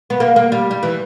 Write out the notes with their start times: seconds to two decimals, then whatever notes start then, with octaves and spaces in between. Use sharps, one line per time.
0.10 B3
0.20 A#3
0.36 A#3
0.52 G3
0.71 G3
0.83 E3